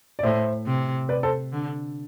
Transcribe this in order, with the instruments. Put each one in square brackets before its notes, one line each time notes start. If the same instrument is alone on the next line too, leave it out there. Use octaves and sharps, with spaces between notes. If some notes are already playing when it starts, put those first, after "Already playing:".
[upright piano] D5
[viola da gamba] A2 [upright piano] C5 E5
[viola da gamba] C3
[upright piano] B4 D5
A4 C5
[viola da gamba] D3